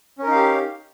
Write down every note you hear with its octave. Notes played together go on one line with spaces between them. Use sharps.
C#4 D#4 G4 A#4 F5